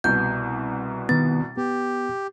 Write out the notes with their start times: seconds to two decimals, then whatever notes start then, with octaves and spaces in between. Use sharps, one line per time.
0.04 C2 B2 G6
1.09 D#3 B3 A6
1.57 B3 G4